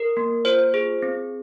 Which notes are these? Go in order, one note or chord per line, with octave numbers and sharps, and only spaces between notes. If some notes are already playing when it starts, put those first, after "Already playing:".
Already playing: A#4
A#3
F4 C5
G#4
C4